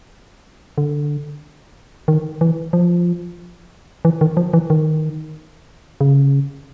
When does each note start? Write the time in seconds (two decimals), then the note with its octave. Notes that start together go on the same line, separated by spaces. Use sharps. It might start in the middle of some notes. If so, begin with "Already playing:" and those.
0.78 D3
2.08 D#3
2.41 E3
2.73 F3
4.05 E3
4.21 D#3
4.37 F3
4.53 E3
4.70 D#3
6.01 C#3